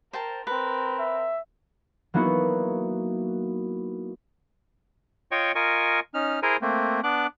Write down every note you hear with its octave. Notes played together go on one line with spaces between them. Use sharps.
A#4 C5 G5 A5
C4 A#4 B4
E5
F#3 A#3 B3 D#4 E4 F#4
F4 C#5 D#5 G5 C#6
F4 A#4 D#5 G#5 C#6
C#4 D#4 F6
E4 G#4 A#4 C5 G#5 A#5
A3 A#3 C4
B3 D4 D6 F#6